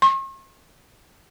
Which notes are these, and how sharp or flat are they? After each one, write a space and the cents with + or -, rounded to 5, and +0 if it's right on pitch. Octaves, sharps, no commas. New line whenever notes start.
C#6 -45